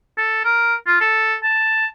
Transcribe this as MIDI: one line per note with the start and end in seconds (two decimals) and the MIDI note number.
0.18 0.43 69
0.45 0.75 70
0.87 0.97 65
1.01 1.35 69
1.43 1.86 81